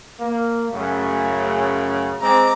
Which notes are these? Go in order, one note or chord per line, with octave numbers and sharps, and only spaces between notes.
A#3
F#2 C#3 A3
G#3 C4 A#5 D6